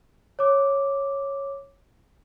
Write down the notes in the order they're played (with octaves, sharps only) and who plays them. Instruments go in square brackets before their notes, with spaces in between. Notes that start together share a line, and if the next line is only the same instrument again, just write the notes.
[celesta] C#5 D6